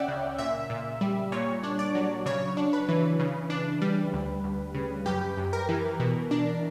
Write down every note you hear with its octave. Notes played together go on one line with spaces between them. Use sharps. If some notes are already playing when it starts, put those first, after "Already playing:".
Already playing: C#2 C#4 C#5 D5 E5 F#5 G5
C#3
A#2 E5
A#2
G3
A#2 C#5
D4
D5
F#3
C#3 C#5
D4
B4
E3
C#3
D4
G3
D2
D2
C#3
F#2 G4
F#2
A#4
E3
B2
D4